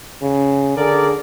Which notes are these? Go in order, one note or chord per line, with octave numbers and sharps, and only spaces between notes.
C#3
D3 G#4 A#4 D5